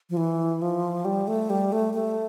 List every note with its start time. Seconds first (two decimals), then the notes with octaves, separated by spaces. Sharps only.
0.10 F3
0.17 E3
0.62 F3
1.05 G3
1.27 A3
1.50 G3
1.72 A3
1.94 A3